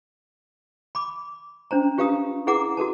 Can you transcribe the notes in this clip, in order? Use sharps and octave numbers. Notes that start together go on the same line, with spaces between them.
B5 D6
C#4 D4 C5 A#5
F4 G4 B4 F5 A#5 D#6
E4 G#4 B4 F#5 A#5 D6
F#4 A4 B4 A5